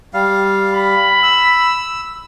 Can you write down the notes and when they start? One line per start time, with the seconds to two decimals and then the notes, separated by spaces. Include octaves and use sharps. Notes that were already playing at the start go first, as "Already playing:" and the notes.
0.14 G3 F5
0.74 B5
1.23 E6